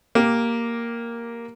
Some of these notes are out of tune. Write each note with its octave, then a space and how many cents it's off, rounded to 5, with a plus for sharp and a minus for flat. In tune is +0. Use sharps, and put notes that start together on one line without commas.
A#3 +0 G4 -5